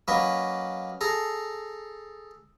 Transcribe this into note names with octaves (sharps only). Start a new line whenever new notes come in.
F#3 A#3 C#4 B4 D#5
G#4 A4 A#5